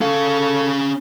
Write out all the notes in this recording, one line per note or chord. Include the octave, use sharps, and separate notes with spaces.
C#4 A4 F5